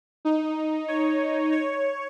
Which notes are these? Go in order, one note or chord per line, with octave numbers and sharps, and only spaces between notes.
D#4
C#5
C#5